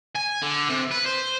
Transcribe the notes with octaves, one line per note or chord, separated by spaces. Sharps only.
G#5
D3
C3
B4
C5